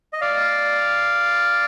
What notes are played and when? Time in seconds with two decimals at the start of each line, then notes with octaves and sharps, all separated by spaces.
0.13 D#5
0.21 D5 F5